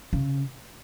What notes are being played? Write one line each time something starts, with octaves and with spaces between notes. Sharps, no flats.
C#3